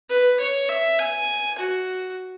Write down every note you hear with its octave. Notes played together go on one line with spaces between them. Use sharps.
B4
C#5
E5
G#5
F#4